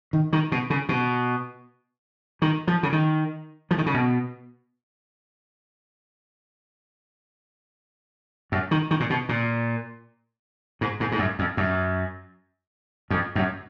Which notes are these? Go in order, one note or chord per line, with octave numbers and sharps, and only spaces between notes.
D#3
D#3
B2
C#3
B2
D#3
F3
C#3
D#3
F3
D#3
C#3
B2
F#2
D#3
D#3
A#2
B2
A#2
G#2
G#2
G#2
F#2
F2
F#2
F2
F#2